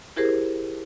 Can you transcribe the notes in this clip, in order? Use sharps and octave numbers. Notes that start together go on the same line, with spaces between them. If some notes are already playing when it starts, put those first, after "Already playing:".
E4 G4 G#4 A#4 C5